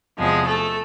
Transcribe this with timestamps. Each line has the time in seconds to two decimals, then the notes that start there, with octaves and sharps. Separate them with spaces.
0.19 E2 C3 F3 G#3 G#4
0.47 A3 A4